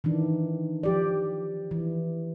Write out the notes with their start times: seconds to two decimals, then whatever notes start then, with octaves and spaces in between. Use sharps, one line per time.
0.04 D#3 E3 D4
0.83 F3 G4 D5
1.71 E3